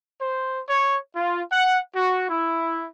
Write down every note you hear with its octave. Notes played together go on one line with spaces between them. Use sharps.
C5
C#5
F4
F#5
F#4
E4